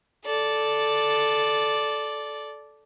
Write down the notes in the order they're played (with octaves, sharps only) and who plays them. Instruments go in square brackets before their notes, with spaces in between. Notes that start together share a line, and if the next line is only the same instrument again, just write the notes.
[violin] A4 D5